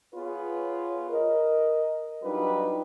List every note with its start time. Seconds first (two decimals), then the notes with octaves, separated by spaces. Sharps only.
0.14 B3 F4 G#4 B4 C#5
1.10 A#4 D#5
2.22 F#3 G3 D4 D#4 F4 B4